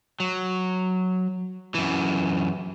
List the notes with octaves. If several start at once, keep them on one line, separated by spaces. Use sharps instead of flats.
F#3
F#2 E3